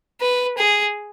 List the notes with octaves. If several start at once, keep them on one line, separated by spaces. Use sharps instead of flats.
B4
G#4